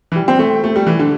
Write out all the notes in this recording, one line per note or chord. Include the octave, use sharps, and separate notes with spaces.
E3
G3
C4
A3
A3
G3
E3
D3